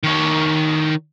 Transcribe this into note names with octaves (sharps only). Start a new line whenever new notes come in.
D#3 C#5